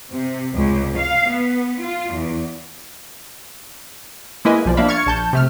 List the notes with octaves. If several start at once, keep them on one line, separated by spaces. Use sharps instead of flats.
C3
C#2
F5
B3
F4
E2
G#3 A#3 E4 B4 D#5 G#5
B1 F3 D5
A#3 D4 E5 F5 B5
C#6 F6 G#6 A6 C#7
A#1 A5 G6
C3 A3 F6